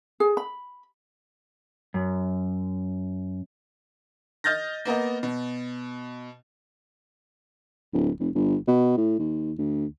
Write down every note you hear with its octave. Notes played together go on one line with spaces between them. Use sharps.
G#4
B5
F#2
D#5 F6 G6 A6 A#6
A#3 B3 A#4 D#5
B2
D1
F1
G1
B2
A2
D#2
D2